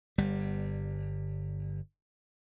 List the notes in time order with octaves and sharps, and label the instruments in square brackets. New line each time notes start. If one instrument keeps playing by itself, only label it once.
[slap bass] G1 G3